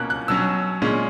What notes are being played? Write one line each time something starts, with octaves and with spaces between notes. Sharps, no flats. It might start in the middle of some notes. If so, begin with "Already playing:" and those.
Already playing: B2 A#3 C#4 F#6
F#6
B2 F#3 C#4 E6
A#2 G#3 C#4